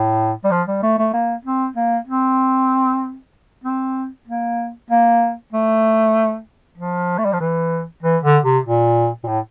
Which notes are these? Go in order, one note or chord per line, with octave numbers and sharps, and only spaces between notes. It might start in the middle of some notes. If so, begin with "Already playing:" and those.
Already playing: A2
G3
F3
G3
A3
A3
A#3
C4
A#3
C4
C4
A#3
A#3
A3
F3
A3
G3
F3
E3
E3
D3
C3
A#2
A#2
A2